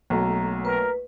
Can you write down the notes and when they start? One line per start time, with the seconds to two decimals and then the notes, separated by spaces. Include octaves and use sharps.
0.10 B1 F#3 A3 A#3 A#5
0.65 A#4 B4